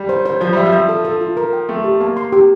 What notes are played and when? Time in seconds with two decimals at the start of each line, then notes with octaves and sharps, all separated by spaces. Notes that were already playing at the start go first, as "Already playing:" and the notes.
Already playing: G3
0.09 C5
0.26 C5
0.41 F3 C5
0.53 G3 E5
0.66 F3
0.72 E5
0.89 A4
1.05 A4
1.21 F4
1.37 A#4
1.53 G5
1.68 A3 G5
1.84 G4
2.00 A#3 A5
2.17 C6
2.32 G4